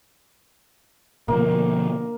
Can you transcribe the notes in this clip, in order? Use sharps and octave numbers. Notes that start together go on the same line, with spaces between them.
B2 D3 F3 A#3